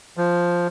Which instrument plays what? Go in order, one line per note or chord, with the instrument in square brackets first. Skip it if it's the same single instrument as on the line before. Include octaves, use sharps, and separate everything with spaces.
[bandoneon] F3